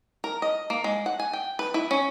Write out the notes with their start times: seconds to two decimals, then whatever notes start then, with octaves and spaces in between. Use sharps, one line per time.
0.24 A#4
0.42 D#5
0.70 A#3
0.84 G#3
1.06 F#5
1.20 G#5
1.33 G5
1.59 B4
1.74 E4
1.91 C#4